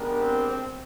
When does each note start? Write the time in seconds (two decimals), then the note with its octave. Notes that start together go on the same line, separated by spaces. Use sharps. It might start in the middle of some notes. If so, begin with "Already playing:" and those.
Already playing: G#3 B3 D4 G4 A#4
0.21 C4